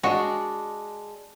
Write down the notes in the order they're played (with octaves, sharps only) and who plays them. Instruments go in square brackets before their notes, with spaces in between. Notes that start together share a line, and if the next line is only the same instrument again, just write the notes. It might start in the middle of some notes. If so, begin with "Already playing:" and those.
[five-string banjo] G#3 D4 [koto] F#4